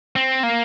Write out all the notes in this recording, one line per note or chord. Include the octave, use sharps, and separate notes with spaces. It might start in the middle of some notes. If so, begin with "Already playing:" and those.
C4
A#3